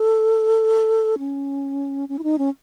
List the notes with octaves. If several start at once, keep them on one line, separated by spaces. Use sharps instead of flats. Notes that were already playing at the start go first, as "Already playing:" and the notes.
Already playing: A4
C#4
C#4
E4
D#4
C#4